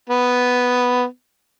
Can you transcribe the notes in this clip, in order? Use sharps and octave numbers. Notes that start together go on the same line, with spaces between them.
B3